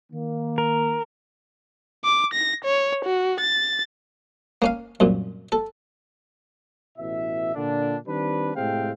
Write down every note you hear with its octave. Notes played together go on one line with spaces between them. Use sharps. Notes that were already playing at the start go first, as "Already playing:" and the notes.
D#3 A#3
A#4
D6
A#6
C#5
F#4
A6
A#3 C#4 F5
C2 F#2 A#2
A4
A1 B2 E4 E5
A#2 D3 D4
D#3 G3 C4 D4 B4
A2 C3 G#3 C4 F5 G5